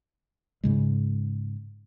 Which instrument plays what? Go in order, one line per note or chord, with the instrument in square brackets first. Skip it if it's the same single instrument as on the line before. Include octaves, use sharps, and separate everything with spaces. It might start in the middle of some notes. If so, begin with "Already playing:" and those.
[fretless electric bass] G#2 C#3 G#3